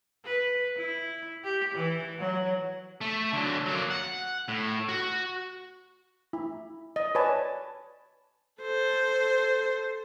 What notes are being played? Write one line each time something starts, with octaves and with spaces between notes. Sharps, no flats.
B4
E4
G4
E3
F#3
A3
D3 F#3
F#3 A#3
F#5
A2
F#4
E4
D#5
B4 C#5 D5 G#5 A5
A4 C5